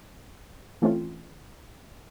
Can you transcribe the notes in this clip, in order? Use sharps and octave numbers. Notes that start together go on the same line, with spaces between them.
E3 A3 C4 C#4 F4